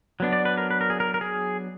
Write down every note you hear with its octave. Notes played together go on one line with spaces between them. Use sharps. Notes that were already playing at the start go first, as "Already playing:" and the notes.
F#3 B3 D4
D5
B4
A#4
B4
A#4
G#4
A#4
A#4
G#4